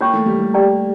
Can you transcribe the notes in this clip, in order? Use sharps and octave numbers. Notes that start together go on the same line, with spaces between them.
A#3 F4 C#5 G5 C#6
A3
G3
A3
G4 D5 G5 A#5